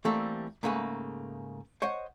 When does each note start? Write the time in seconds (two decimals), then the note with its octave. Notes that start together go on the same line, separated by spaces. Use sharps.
0.05 E3 G3 A3 A#3 C4 A4
0.63 G#2 C#3 A3 A#3 B4 G#5
1.82 C5 C#5 D#5 F#5